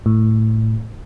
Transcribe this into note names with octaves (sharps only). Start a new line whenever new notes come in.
A2